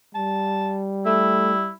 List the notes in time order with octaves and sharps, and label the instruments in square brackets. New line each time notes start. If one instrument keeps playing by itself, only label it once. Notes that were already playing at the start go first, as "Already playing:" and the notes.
[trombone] G3 [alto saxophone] A5
[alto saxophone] A3 [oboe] E4